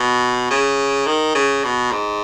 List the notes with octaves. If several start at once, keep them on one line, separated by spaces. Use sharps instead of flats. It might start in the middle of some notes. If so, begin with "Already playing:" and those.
Already playing: B2
C#3
D#3
C#3
B2
G#2